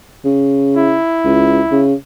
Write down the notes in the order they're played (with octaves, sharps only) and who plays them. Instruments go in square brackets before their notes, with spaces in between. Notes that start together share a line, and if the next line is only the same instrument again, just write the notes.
[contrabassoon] C#3
[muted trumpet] E4
[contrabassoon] C#2
C#3